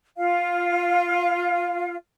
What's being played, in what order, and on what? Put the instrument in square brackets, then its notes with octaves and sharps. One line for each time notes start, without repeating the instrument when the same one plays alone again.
[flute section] F4 F5